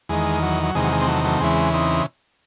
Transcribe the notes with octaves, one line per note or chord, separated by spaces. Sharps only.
E2 D#3 G#3
F#3
F#3
E2 C3 D#3 G#3
F#3
G#3
C4
F#3 A3
F#3 A3
E2 C#3 E3 G#3 C4
C4 D#4